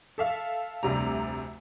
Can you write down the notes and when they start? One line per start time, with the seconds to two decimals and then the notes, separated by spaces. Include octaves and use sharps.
0.18 A4 E5 F5
0.83 F1 D2 C3 G3 A#5